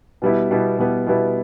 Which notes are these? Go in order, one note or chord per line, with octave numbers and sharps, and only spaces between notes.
B2 G3 B3 E4
B2 G3 B3 E4
B2 G3 B3 E4
B2 G3 B3 E4